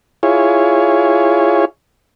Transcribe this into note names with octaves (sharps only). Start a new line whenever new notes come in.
E4 F4 G#4 C#5